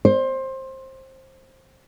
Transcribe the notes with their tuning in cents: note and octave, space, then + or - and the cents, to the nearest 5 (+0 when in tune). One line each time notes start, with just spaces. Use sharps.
C5 +20